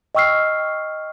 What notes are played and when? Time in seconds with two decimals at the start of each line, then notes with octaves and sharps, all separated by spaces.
0.15 D#5 G5 C#6 E6 F6 C7